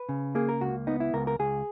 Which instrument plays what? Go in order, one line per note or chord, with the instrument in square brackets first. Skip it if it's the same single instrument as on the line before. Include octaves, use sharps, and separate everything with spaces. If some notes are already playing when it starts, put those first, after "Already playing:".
Already playing: [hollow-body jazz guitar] B4
C#3
A#3 G#4
A#4
C#2 F#4
B3 D#4
E4
C#2 A#4
A#4
C#2 G#4